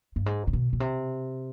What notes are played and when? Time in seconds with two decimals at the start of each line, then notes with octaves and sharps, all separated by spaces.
0.16 G2
0.26 G#2
0.47 C3
0.53 B2
0.73 B2
0.80 C3